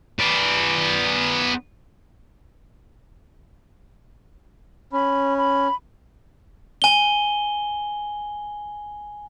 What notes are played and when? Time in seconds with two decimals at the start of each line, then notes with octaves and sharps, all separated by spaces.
0.19 B3 D5
4.93 C#4 B5
5.38 B5
6.82 G#5 G7